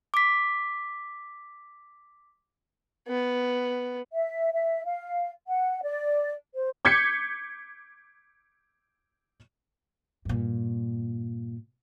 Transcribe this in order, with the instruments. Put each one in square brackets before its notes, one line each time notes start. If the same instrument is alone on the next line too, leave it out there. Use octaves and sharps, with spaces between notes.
[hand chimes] D6 B6
[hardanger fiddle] B3
[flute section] E5
E5
F5
F#5
D5
C5
[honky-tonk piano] D6 G6 G#6 B6 C#7
[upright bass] G2 A#2